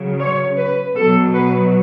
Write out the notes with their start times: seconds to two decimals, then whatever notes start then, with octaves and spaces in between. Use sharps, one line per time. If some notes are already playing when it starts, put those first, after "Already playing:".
Already playing: C#3 F#3
0.19 C#5
0.57 B4
0.95 B2 F#3 A4
1.33 B4